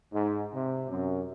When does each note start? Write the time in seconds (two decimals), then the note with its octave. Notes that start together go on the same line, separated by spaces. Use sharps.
0.12 G#2
0.54 C3
0.89 F#2